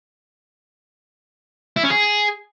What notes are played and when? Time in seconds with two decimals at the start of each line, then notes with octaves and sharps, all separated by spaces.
1.76 E4
1.83 C#4
1.90 G#4